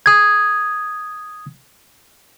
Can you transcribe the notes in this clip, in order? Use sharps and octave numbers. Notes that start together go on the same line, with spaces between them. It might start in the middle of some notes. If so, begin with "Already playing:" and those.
D#6 G#6